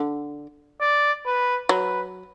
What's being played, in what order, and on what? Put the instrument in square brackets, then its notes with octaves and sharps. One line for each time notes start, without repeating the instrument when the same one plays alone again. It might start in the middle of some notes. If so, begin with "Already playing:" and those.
Already playing: [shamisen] D3
[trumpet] D5
B4
[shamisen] F#3 [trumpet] B4